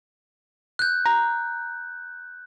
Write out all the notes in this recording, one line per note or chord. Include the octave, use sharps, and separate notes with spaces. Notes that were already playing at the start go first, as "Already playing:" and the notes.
F#6 G6
A#5